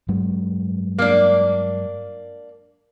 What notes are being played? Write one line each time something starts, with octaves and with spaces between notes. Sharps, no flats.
G2 F#3 G#3
A#3 D4